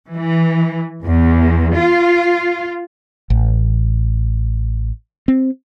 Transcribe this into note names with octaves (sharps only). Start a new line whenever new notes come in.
E3
E2
F4
A1
C4